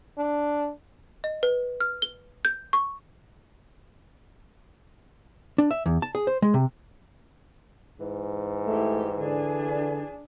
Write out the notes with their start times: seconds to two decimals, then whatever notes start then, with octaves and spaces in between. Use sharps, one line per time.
0.18 D4
1.24 D#5
1.43 B4
1.81 F6
2.02 G7
2.45 G6
2.73 C#6
5.58 D4
5.71 E5
5.86 E2
6.02 A5
6.15 G#4
6.27 C5
6.42 G#3
6.54 C3
8.00 G#2 E3
8.67 A3 E4 G4
9.19 D3 D4 G#4